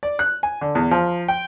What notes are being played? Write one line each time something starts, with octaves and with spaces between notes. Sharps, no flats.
D5
F#6
G#5
D3
E2
F3
G5